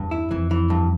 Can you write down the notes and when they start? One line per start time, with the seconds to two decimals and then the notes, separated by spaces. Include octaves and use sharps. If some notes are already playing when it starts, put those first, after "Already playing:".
Already playing: E2 G2
0.11 E4
0.31 F2 E3
0.51 E3
0.70 G2